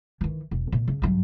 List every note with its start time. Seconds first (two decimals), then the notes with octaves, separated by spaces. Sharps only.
0.21 D#3 E3
0.51 E1
0.72 A#2
0.88 C#3
1.02 G2 F#3